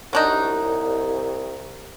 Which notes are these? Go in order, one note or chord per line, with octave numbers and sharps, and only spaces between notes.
C2 F#3 D4 D#4